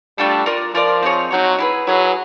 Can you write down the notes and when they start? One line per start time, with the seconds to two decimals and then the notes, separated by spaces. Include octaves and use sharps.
0.18 G3 A3 D4 F4 A4
0.46 F4 A#4 D5
0.75 F3 F4 A#4 D5
1.02 C4 D#4 G#4 C#5
1.31 F#3 C4 D#4 G#4 C#5
1.58 E4 G#4 B4
1.87 F#3 E4 G#4 B4